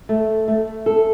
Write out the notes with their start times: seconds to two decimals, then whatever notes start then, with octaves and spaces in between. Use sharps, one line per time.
0.09 A3
0.48 A3
0.86 A4